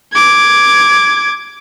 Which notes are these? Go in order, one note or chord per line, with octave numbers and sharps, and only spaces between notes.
D6 G#6